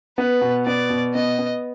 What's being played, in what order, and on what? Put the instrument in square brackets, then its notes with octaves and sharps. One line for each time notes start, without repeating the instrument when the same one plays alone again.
[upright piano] B3 [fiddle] B4
[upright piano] B2
[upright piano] B3 [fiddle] D5
[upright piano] B2
[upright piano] B3 [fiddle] D#5
[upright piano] B3